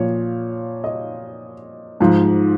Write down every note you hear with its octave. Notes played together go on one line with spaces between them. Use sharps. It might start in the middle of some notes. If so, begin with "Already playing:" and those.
Already playing: A#2 F3 C#5
D#5
G#2 F3